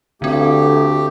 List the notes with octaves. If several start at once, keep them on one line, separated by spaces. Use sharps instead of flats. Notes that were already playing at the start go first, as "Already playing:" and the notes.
D2 D3 A3 C4 G4